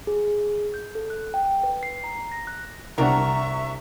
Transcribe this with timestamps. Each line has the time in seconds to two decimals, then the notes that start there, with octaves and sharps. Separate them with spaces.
0.07 G#4
0.74 G6
0.95 A4
1.10 F#6
1.34 G5
1.63 B4
1.83 C7
2.04 A#5
2.32 A#6
2.47 F#6
2.98 C2 D4 G4 A#4 E5 F#5 A#5 C#6